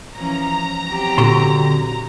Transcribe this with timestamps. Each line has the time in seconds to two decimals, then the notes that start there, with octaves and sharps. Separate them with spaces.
0.17 E3 F3 C#4 A#5
0.87 F#3 C4 G4
1.18 A#2 D3 F#4 C6